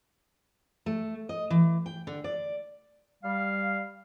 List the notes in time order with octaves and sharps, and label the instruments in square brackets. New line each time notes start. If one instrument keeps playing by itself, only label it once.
[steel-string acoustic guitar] A3
D#5
E3
G5
D3
D5
[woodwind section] G3 F5